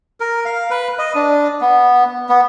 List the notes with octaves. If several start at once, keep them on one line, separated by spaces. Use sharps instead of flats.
A#4
F5
B4
D#5
D4
B3
B3